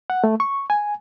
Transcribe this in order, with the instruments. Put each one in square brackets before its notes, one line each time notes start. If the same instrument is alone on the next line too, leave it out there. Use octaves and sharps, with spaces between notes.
[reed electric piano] F#5
A3
C#6
G#5